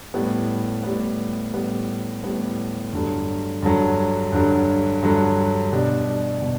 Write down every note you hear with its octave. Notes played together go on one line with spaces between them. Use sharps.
A2 G3 B3
A2 G3 B3
A2 G3 B3
A2 G3 B3
G2 D3 F#3
G2 D3 F#3
G2 D3 F#3
G2 D3 F#3
B2 G3 D4
B2